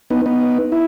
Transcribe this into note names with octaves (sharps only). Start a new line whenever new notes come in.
B3 D#4
B3 D#4
E4